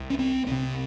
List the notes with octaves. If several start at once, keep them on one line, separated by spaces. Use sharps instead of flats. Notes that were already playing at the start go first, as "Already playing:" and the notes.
Already playing: C2 C3
C#4
C4
C2 C3 C4